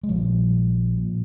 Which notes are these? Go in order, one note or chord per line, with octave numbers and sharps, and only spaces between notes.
G#3
A#1 A#2 F3 G3
A#2